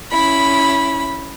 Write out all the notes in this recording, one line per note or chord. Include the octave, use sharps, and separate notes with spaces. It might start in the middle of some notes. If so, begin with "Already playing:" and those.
C#4 E4 B5